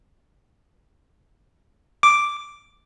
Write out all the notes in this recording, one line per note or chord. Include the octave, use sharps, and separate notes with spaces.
D6